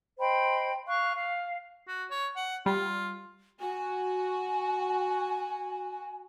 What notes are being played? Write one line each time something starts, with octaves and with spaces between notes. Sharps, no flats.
C5 D#5 G5 B5
F5 C#6 F#6
F5
F#4
C#5
F#5
G3 F4
F#4 G#5